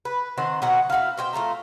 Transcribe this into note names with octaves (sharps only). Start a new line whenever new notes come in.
B4
D#3 C4 C5 F#5
B2 F#3 F#5 A#5
E4 F#4 A#4 F5
B2 C5 G5
A3 F4 A5 A#5